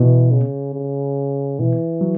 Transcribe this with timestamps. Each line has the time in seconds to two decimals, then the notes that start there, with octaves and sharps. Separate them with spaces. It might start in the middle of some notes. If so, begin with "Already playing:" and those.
Already playing: B2 E3
0.31 C#3
0.74 C#3
1.59 B2 E3
2.01 F#3